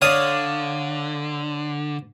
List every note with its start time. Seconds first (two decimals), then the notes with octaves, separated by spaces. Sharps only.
0.02 D3 C#5 D5 F5 D#6